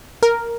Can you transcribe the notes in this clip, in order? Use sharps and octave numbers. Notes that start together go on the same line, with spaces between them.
A#4